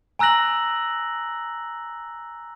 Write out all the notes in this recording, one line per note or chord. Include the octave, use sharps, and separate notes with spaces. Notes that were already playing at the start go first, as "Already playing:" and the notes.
G#5 A#5 E6 F#6 A#6 F#7